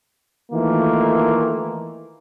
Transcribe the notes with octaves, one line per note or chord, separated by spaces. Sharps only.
D#3 E3 A3 A#3 F4